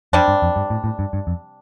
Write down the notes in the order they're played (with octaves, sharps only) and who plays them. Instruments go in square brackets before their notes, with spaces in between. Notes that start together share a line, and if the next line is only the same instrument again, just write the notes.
[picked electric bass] F2 [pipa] C3 G3 D4
[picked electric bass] G2
F2
G2
A2
A2
G2
G2
F2